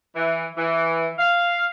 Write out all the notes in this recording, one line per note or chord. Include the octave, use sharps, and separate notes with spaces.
E3
E3
F5